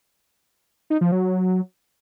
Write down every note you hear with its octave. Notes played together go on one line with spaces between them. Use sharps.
D#4
F3
F#3